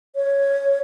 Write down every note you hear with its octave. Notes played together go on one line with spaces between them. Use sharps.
C#5